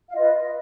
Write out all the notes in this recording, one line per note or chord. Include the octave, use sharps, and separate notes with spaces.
F5
F4 B4 D#5
D#5